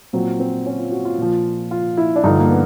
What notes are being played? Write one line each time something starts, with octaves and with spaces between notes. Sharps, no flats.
A#2 F#3 C4
C4
C#4
F4
F#4
F4
A#2 F3
F4
E4
D4
G2 D3 F3 D#4
A#3
B3